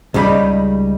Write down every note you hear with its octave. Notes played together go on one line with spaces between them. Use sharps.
C#2 C#3 G3 D#4 B5